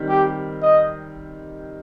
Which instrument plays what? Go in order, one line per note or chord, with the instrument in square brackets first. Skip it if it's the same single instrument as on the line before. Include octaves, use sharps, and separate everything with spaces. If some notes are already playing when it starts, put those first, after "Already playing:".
Already playing: [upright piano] D#3 G3 C4
[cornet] G4
D#5